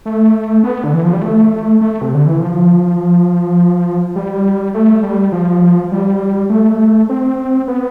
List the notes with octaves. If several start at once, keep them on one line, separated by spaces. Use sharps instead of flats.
A3
B3
D3
E3
F3
G3
A3
A3
C3
D3
E3
F3
G3
A3
G3
F3
G3
A3
C4
B3